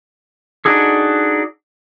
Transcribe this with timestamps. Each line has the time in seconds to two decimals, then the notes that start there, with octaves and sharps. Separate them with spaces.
0.65 D4 D#4 F#4 G#4 A4